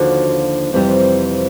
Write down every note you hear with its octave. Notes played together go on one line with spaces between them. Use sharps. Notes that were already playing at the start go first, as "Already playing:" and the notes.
Already playing: D#2 D3 F3 F#4
F2 C3 E3 G3